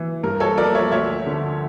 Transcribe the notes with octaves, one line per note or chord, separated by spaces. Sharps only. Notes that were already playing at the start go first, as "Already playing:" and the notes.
Already playing: E3
G2 A#4
A4 C#5
F3 A#3 A#4 D5
C#5 E5
D2 C#5 E5
D3 F3